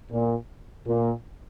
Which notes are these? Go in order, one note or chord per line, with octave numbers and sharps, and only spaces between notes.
A#2
A#2